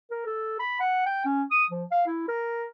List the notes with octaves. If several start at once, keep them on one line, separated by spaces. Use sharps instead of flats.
A#4
A4
B5
F#5
G5
C#4
D#6
F3
F5
E4
A#4